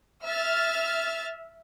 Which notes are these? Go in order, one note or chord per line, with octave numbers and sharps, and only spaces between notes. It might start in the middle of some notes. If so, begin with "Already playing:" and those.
E5 F6 A6